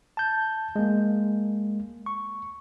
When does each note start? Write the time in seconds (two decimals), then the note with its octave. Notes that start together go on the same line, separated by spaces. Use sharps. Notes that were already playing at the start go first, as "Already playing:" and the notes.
0.17 A5 G6
0.76 G#3 A#3
2.06 C#6